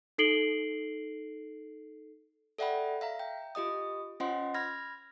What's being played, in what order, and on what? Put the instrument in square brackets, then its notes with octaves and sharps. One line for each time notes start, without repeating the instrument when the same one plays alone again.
[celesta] D#4 A4 C7 D7 F#7 G7
[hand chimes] A4 D5 E5 F#5 G5 B5
E5 F5 A#5
G5
F4 G4 D#5 D#6
C#4 F4 C5 D#5 F#5 C6
B5 F6 G#6 A#6